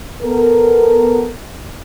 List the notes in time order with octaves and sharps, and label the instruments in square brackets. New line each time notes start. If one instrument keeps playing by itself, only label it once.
[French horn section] B3 A4 A#4